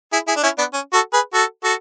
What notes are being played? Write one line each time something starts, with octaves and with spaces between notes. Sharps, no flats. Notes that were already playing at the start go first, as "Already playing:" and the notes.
E4 G#4
E4 G#4
D4
C#4 E4
B3 D4
C#4
F#4 A4
G#4 B4
F#4 A4
F#4 A4